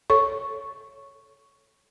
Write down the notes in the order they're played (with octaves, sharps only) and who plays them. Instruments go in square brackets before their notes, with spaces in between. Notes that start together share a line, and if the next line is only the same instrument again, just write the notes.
[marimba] A4 C#5 C#6